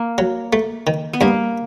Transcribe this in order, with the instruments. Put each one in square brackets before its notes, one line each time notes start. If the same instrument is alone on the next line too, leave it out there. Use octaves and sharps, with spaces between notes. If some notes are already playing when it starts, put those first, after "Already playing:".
Already playing: [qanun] A#3
[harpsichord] F#3
A3
D#3
[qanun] B3
[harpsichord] G2 [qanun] A#3